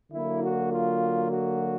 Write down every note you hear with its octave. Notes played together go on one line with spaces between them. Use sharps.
D3 F#3 A#3 E4
F#4
F4
F#4